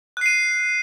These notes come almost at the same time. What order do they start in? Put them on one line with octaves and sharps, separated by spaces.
F#6 C7 D#7